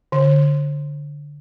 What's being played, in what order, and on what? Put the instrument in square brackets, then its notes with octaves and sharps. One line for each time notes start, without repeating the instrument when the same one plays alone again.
[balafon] D3